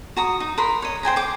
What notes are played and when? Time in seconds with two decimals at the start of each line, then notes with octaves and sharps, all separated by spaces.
0.16 F#4 A#5 D#6
0.40 D#4
0.58 A#4 B5 C6
0.82 C#5 D#5
1.03 C5 G5 G#5 A#5
1.16 C5 D6